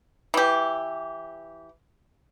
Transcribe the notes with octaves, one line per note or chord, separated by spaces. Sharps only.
E3 G4